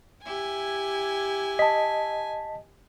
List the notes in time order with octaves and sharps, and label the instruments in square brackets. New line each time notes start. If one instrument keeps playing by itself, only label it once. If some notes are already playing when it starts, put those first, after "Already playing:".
[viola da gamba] E4 G4 [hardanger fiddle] G#5
[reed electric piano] D#5 [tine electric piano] A5 B6